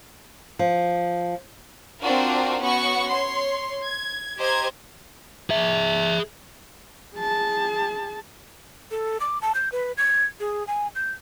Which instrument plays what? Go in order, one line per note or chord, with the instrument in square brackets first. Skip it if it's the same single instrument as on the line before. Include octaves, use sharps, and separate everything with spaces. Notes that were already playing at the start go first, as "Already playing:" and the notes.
[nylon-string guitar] F3
[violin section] C4 D4 F4 F#4 A#4
B3 C#4 F#4 F#5 C#6
C#5 C6
G#6
G4 C5 D#5 A#5 G#6
[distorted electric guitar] G#4 E5
[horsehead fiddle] G#4 A5
[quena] A4
D6
A5
G6
B4
G#6
G#4
G#5
G6